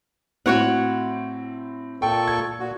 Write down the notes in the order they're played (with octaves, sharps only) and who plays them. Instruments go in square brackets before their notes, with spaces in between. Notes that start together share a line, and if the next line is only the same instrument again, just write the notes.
[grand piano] A2 C4 [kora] F#4 C#5 F#5
[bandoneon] A#2 A4 C#6 [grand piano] G5
[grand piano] G#6
[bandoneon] A#2 F#4